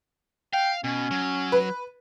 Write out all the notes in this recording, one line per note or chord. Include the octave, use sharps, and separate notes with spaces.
F5 G5
B2 C#4
F#3
B4